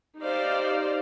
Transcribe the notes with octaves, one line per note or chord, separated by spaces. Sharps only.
D#4 G4 C5 D5 F5